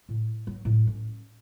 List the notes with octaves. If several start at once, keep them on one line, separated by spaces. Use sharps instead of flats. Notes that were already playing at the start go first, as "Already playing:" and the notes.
A2
F#3
A2
C#4